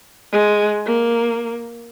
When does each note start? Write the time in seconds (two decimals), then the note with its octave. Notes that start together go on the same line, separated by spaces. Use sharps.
0.32 G#3
0.86 A#3